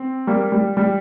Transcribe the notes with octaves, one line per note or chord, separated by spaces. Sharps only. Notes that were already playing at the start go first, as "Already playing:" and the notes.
Already playing: C4
G3 A#3
G3
G3